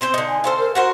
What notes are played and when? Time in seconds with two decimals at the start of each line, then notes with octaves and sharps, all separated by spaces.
0.01 C4 C5 G5
0.14 D3 D#4
0.28 G#5
0.44 A4 C5 F5
0.59 A#4
0.75 F#4 A#4 C5 F#5